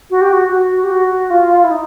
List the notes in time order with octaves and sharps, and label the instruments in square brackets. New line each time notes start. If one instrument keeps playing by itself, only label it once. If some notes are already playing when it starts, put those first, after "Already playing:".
[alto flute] F#4
G4
F#4
F#4
G4
F#4
F4
E4
D#4